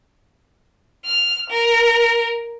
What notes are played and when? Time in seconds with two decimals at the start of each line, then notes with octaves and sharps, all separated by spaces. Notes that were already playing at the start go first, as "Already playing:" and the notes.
1.03 F6
1.50 A#4